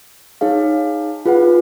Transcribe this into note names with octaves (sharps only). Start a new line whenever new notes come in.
D#4 G#4 C#5 F5
F4 G#4 B4 F#5